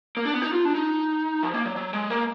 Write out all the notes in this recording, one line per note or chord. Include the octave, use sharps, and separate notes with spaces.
A#3
D4
B3
D#4
F4
D4
D#4
F3
A#3
F#3
F#3
G#3
A#3